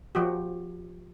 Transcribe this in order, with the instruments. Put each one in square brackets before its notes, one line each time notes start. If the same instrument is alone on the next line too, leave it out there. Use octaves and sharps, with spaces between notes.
[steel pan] F3 F#4 G4